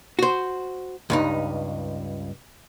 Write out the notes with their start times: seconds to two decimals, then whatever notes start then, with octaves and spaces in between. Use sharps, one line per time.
0.19 F#4 C5
1.10 C#2 G2 D#4